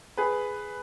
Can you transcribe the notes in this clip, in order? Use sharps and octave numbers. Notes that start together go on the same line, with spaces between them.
G#4 B4